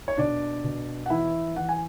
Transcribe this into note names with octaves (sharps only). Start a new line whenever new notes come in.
C#5
B2 D4 D5
B2
F#5
E3 E4 E5
E3 F#5
G#5